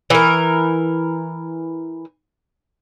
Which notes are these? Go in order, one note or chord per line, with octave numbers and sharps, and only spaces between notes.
E3 A#4